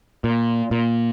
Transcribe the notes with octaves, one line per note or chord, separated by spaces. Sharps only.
A#2
A#2